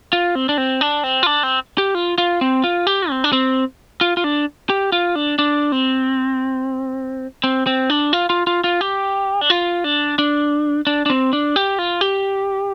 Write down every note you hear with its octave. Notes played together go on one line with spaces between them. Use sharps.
F4
C4
D4
C4
D4
C4
F4
D4
C4
G4
F4
F4
C4
F4
G4
C4
D4
C4
F4
F4
D4
G4
F4
D4
D4
C4
C4
C4
D4
F4
F4
F4
F4
G4
D4
F4
D4
D4
D4
D4
C4
D4
G4
F4
G4